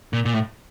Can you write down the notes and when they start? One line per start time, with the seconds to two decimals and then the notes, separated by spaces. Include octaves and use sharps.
0.13 A#2
0.25 A#2
0.34 A2